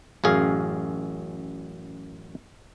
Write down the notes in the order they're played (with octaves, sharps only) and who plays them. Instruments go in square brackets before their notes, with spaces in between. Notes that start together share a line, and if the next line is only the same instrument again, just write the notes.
[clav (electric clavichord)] A1 F#2 G#4 F5